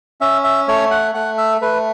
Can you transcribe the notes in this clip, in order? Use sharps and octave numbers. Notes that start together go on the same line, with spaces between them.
C#4 E5
E5
A3 C#5
F#5
A3 F#5
E5
A3 B4